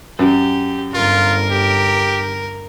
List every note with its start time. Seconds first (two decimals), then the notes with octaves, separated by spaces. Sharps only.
0.19 F#2 G4
0.94 G1 F4 A#4
1.51 G4